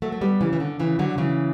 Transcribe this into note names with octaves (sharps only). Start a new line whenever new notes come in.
F#3 A3
A3
G3 B3
C#3 E3
E3
D3
C#3 E3
D3 F#3
C#3 E3